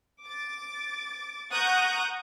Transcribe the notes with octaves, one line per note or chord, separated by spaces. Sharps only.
D6 A6
F#5 A#5 C#6 D#6 F#6 G6